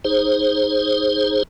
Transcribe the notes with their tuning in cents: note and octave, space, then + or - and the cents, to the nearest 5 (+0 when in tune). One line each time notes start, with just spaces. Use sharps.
D#4 +0 G#4 +0 C5 +15